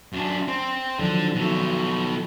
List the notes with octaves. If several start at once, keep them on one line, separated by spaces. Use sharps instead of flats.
F#2 D4
C4
D3 D#3 F3 F#3
B2 F#3 A4